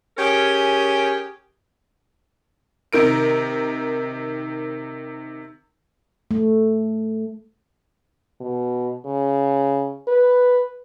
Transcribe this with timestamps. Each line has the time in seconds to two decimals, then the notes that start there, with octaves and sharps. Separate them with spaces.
0.18 C#4 G4 G#4 A#4
2.93 C3 D#3 A#4 D7
6.31 A3
8.41 B2
9.05 C#3
10.08 B4